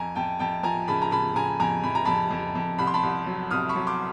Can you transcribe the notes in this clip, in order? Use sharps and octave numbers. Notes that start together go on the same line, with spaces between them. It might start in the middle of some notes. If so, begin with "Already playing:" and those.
Already playing: F2 G#5 A#5
F2 G5 A5
F2 G5 A5
F3 G#5 A#5
C#3 A5 B5
A#5
C#3 A5 B5
C#3 G#5 A#5
F2 G#5 A#5
F2 B5
A#5
F2 A5 B5
F2
F2
C2 B5
C6
A5 B5
C2
F#3
C2 D#6 F6
B5 C#6
F#3
C6 D6